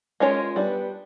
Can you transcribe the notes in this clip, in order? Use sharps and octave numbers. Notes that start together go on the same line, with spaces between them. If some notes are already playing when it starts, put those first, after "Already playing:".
G#3 C#4 F4 A#4 C#5
G3 B3 D4